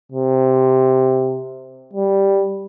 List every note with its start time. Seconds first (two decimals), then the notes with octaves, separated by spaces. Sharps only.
0.12 C3
1.93 G3